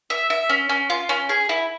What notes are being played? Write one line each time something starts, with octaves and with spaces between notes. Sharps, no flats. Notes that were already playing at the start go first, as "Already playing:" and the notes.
E5
E5
C#4
C#4
F4
C#4
G#4
E4